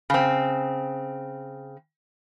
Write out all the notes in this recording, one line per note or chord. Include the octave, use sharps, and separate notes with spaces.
C#3 C4